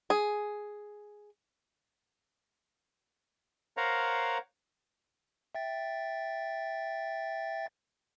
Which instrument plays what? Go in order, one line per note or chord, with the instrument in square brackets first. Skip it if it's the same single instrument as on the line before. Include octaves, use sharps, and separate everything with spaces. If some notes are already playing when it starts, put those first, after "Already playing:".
[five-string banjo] G#4
[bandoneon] A#4 C5 C#5 F5 F#5 A#5
[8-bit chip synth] E5 G5 A6